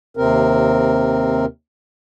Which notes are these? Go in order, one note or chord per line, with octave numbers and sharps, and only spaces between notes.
D#2 C3 C4 A#4